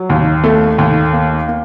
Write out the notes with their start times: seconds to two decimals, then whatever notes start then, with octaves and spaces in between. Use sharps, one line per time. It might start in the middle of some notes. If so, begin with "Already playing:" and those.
Already playing: F#3
0.10 D#2
0.44 A3
0.78 D#2
1.13 A#3
1.48 A#3